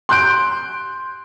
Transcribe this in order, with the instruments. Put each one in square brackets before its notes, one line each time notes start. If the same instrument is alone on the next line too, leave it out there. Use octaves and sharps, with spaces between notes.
[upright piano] C6 F#6 G6 D7